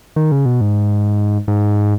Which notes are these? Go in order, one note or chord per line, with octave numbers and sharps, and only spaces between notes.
D#3
C#3
B2
G#2
G#2